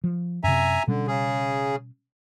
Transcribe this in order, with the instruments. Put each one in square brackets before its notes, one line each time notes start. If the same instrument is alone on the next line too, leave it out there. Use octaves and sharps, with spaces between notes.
[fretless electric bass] F3
[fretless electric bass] F#2 C3 [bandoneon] E5 G#5 A#5
[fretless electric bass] B2 G3 C#4 [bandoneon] D3
[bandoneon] C#3 G#4